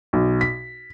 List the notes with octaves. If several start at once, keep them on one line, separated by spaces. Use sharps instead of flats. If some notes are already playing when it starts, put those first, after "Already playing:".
B1
B6